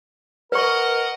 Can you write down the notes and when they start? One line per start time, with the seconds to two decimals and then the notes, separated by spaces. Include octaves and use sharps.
0.52 A#4 B4 D#5 F#5 C#6